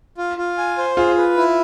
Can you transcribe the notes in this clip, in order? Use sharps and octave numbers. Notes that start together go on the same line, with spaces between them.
F4
F4
G#5
C5
F4 G#4
B4
E4